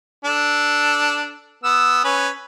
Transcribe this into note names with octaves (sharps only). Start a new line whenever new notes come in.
D4 A4
B3 E6
C#4 B4